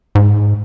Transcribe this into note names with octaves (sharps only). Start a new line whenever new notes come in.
G#2